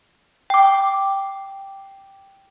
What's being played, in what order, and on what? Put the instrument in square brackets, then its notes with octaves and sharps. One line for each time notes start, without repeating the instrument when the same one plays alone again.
[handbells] G5 D6